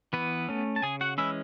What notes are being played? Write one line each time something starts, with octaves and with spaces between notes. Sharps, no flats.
E3 B3 B4
A3 C#4
A5
C#3 G#4 G#5
F#4 F#5
E3 G#3 C#4 E4 E5